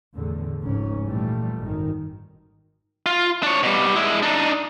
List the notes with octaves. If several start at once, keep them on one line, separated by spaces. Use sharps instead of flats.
E2 A2 D3
F1 C#2 G#2 C#4
A#2 E3 F3 G3 A3
G#1 F#2 D#3
F4
D4 C#5
B2 G3
G#3 E4
D4 D#4